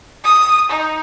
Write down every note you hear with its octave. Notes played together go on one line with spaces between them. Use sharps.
D#6
D#4